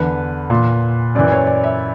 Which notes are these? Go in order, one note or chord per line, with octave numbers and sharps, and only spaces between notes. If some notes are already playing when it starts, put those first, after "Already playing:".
Already playing: E2 D3 B4
A#2
F#2 E3 D5
C#5
D5
E5